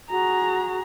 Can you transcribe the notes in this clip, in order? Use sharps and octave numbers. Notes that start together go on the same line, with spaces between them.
F#4 G#4 A#5